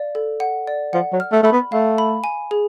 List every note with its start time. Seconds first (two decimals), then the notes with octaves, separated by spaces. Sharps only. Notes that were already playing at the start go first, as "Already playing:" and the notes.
Already playing: D5 F5
0.15 A4
0.40 F#5
0.67 D5
0.93 F3 F#5
1.12 F#3
1.20 F6
1.32 A3
1.43 A3 B5
1.52 B3
1.72 A3 F5
1.98 B5
2.24 G#5
2.51 G#4